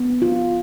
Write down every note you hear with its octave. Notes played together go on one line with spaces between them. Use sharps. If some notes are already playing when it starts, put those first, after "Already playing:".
Already playing: B3
F4